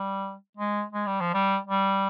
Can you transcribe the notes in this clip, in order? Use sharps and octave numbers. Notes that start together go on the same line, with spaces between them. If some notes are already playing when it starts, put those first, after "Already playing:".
Already playing: G3
G#3
G#3
G3
F3
G3
G3